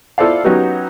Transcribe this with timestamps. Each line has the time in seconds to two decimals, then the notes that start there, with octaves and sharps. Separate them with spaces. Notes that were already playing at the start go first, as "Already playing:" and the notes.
0.18 E4 F4 A4 C5 D5 F5
0.44 F#3 B3 C#4 D#4 F#4 G4